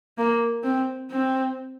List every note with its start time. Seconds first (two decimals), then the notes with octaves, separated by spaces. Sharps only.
0.18 A#3
0.64 C4
1.11 C4